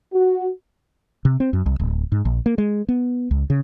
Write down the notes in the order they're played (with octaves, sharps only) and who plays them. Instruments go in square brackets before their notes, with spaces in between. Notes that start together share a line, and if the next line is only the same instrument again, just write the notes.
[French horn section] F#4
[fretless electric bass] C3
C4
F#2
C2
D1
G#2
A#1
A#3
G#3
B3
C#2
C#3